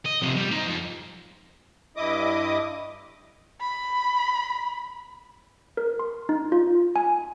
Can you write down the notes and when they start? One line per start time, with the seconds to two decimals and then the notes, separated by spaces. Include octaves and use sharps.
0.06 D#5
0.22 F2 C3
0.36 G3
0.51 D#4 C5
0.66 F2
1.97 G2 E4 D#5 D6 D#6
3.61 B5
5.77 A#4
5.99 C6
6.29 D#4
6.52 F4
6.96 G#5